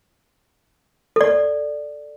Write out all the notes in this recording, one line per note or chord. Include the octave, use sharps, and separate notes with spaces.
A4 D5